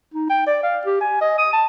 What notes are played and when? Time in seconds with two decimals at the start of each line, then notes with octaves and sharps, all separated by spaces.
0.14 D#4
0.30 G5
0.47 D5
0.63 F5
0.85 G4
1.01 G#5
1.21 D#5
1.38 D#6
1.53 A5